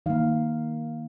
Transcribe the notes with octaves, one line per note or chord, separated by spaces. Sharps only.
D#3 A#3 F5